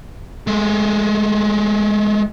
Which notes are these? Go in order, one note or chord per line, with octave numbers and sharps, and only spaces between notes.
G#3 A3